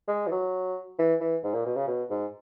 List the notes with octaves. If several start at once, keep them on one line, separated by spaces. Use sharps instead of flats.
G#3
E3
F#3
E3
E3
G#2
A#2
B2
C#3
B2
G#2